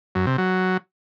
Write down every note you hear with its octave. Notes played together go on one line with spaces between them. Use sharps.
F#2
C3
F#3